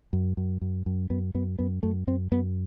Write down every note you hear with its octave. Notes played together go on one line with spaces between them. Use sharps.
F#2
F#2
F#2
F#2
F#2 B3
F#2 B3
F#2 B3
F#2 A3
F#2 C4
F#2 B3